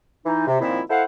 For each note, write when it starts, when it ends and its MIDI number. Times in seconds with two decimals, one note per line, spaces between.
0.25 0.43 52
0.25 0.43 63
0.47 0.58 48
0.61 0.80 46
0.61 0.80 51
0.61 0.80 53
0.61 0.80 60
0.61 0.80 64
0.90 1.03 64
0.90 1.03 69
0.90 1.03 72
0.90 1.03 77
0.90 1.03 78